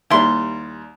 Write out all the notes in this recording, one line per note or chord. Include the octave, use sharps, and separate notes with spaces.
D#2 G3 E4 C6